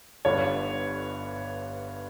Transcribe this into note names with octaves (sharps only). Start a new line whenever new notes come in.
G1 G2 D3 C#5